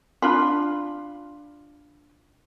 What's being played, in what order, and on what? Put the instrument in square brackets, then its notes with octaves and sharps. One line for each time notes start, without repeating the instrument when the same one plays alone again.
[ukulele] D4 F4 B5